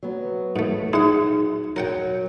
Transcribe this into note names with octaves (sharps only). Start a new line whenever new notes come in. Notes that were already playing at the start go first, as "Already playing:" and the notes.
F#3 B3
G#2 A3
D#4 E4 G#4 F#5
F#3 A#4 F#5 G5